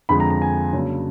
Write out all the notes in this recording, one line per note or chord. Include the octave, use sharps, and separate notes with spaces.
F2 D3 F3 G#3 B5
A#5
A#5
G#5
C#3 F#3 A#3 D4